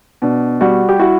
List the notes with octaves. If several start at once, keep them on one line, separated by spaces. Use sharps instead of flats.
B2 D4
G3 F#4
G4
E4 F#4